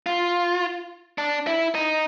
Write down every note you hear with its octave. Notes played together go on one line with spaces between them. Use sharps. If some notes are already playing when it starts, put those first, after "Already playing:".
F4
D4
E4
D#4